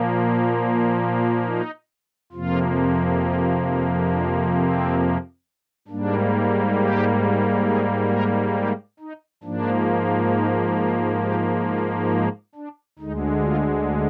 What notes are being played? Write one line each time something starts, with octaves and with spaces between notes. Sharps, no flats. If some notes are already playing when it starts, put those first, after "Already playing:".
Already playing: A#2 F3 A#3
D#4
F2 C3 F3 A#3 F4
F4
D#4
D4
C4
G#2 G3 A#3 D4
G4
G#4
A#4
G4
D#4
G#2 F3 A#3 D4
D#4
F4
G4
F4
D#4
D4
D2 D3 G#3 D#4
F4